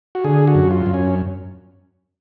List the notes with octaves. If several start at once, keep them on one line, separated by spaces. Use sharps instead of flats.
F#4
D3 G#4
F#4
F#2
F4
F#2
C#4